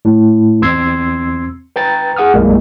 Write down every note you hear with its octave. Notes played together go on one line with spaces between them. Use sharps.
A2
E2 C4 C6 E6 G#6 C7
B4 G5 A#5 A6
G#4 F#5 D#6 F6
B1 F#2 A#2 G3 G#3 A#3